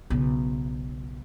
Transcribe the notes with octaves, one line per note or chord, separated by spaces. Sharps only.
B1 C#3